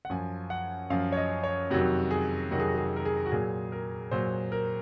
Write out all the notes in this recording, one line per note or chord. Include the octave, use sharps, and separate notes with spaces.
F#5
F#2 F3 G#5
F#5
F#2 F3 F5
C#5
D#5
C#5
F2 C3 D#3 F#3 F#4
G#4
F2 C3 D#3 F#3 F#4
G#4
F#4
G#4
A#4
G#4
F#4
A#2 F#3 G#4
A#4
A#2 F#3 C5
A#4